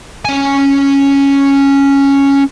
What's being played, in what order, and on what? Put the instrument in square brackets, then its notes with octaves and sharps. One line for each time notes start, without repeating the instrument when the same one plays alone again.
[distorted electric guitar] C#4 G#5